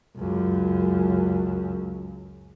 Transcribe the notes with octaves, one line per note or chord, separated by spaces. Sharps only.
C#2 F#2